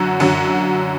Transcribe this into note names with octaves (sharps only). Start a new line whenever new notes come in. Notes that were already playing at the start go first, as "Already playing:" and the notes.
Already playing: F#2 D3 F#3 F#4
F#2 D3 F#3